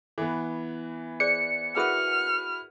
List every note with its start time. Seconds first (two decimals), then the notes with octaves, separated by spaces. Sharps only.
0.18 E3 B3
1.20 G#4 C5 D5 C#7
1.76 E4 F#4 G#4 A#4 B4 F#5 F6